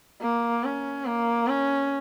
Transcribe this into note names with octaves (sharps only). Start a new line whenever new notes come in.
A#3
C#4
A#3
C#4